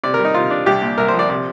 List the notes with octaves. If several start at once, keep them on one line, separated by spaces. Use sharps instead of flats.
C3 D5
A#4
G3
D#4
C3 F4
D4
C2 G4
A#2
C2 A#4
C5
F3
D5
C3 D5